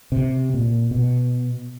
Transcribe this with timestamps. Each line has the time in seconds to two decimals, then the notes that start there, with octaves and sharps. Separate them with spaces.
0.12 C3
0.54 A#2
0.91 B2